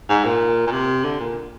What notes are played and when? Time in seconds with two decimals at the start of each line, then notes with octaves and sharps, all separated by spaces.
0.09 G#2
0.25 A#2
0.67 A#2
0.72 C3
1.05 D3
1.20 A#2